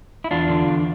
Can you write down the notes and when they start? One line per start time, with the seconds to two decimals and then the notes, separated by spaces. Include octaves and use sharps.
0.24 E4
0.31 E2 D4 F4
0.49 D3
0.68 E2